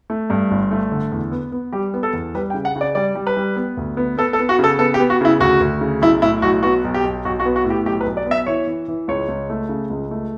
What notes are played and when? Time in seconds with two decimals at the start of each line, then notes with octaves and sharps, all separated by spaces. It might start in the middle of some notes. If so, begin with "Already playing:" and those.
0.10 A3
0.30 G2
0.51 G1
0.71 A3
0.92 D3
1.12 E2
1.32 B3
1.52 B3
1.73 G3 G4
1.94 B3
2.03 A4
2.14 E2
2.35 G3 B4
2.50 G5
2.54 C#3
2.65 F#5
2.76 C#3
2.81 D5
2.95 G3 D5
3.15 G3
3.27 B4
3.37 G3
3.56 B3
3.77 D2
3.97 B3
4.18 B3 A4
4.33 A4
4.39 B3
4.49 F#4
4.59 C#3 A4
4.79 B3 A4
4.94 G4
5.00 B3
5.10 F#4
5.21 C#3 E4
5.40 D2 F#4
5.61 D2
5.81 C#3
6.01 B1 E4
6.22 A2 E4
6.42 B1 F#4
6.63 B3 F#4
6.84 B1
6.94 G4
7.04 B1
7.25 B1 F#4
7.40 F#4
7.46 B3
7.56 F#4
7.65 A2
7.70 G4
7.86 B1 G4
8.01 B4
8.06 B1
8.17 D5
8.26 B3
8.31 E5
8.47 E3 C#5
8.67 E3
8.88 E3
9.08 C#2 C#5
9.28 C#2
9.50 A3
9.69 C#3
9.90 C#2
10.11 A3